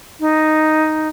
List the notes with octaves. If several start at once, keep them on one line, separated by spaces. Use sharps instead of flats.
D#4